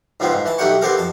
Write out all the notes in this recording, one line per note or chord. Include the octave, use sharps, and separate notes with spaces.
G#2 C#3 F3 B3 C4
G#2
E3 A5
B1 A3 D#4 G4 F#5 C#6
B3 C4 G4 A4 A#4 F5
F2 A5